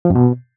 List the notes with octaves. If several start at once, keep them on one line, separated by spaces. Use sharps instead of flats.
F3
F#2
B2